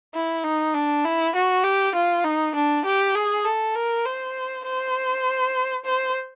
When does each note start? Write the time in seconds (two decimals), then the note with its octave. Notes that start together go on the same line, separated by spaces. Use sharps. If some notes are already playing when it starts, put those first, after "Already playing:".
0.14 E4
0.44 D#4
0.74 D4
1.04 E4
1.35 F#4
1.64 G4
1.95 F4
2.24 D#4
2.55 D4
2.85 G4
3.15 G#4
3.45 A4
3.75 A#4
4.05 C5
4.65 C5
5.85 C5